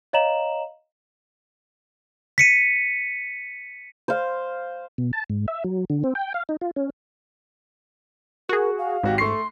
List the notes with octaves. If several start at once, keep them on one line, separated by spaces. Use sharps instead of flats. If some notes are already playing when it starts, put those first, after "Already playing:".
C#5 D#5 F5 A#5 E7 F#7
B6 C#7 D#7
C5 F5
B2
A5
G#2
E5
F#3
D3
C4
G5
F5
D#4
F4
C#4
F#4 G#4 A#4
F5
G#1 G#2 F#4 G4
A3 C6 C#6 C7